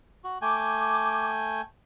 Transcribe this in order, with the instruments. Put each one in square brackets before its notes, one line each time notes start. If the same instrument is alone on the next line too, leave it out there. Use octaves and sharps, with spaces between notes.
[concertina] F#4
[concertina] A3 G5 G#5 [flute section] D6